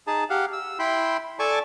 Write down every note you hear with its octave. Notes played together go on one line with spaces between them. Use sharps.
D#4 G#4 A5
G4 F5 F#5
E6
E4 G5 B5 C6
A4 D5 G#5 A5 C#6 D6